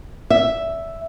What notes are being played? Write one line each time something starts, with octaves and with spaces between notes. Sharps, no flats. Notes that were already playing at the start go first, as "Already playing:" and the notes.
E5